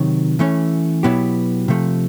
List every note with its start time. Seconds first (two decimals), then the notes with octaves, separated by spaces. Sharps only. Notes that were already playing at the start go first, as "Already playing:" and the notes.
Already playing: C3 D#3 F#3
0.39 E3 A3 C#4
1.03 B2 F#3 B3 E4 G4
1.68 C3 F3 A3